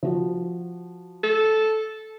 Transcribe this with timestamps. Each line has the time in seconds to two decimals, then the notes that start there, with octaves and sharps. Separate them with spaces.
0.03 F3 F#4
1.24 A4